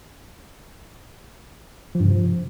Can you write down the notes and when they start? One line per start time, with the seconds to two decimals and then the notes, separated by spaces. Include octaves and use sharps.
1.95 F3
2.00 G2
2.05 C3
2.10 F3